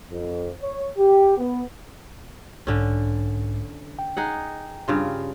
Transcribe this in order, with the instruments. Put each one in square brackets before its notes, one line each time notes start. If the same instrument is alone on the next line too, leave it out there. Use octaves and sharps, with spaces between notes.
[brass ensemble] F2
C#5
G4
B3
[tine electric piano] B1 G#2 [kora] D3 C#4
[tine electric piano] G5
[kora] D#4 G#4 F#5
G2 C#3 F4